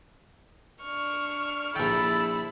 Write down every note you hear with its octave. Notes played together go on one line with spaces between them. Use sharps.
D4 C#6 F6
A#1 E4 A4 G5 B5